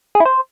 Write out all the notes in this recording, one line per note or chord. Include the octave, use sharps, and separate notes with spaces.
G#4
E4
C5